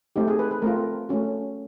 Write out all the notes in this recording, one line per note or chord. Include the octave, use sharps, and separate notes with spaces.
A3 C4 D#4 G4
G#4
B4
B4
A3 C4 F4 A#4
A3 C#4 F#4